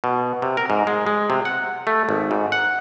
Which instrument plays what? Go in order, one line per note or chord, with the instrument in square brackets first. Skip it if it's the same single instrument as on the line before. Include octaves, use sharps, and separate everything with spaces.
[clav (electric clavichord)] B2
C3
A#4
G#2
G#3
G#3
C3
F#5
A3
G#1
G#2
F#5